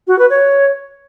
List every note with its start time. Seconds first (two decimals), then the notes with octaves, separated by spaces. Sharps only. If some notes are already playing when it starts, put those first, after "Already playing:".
0.08 F#4
0.19 B4
0.30 C#5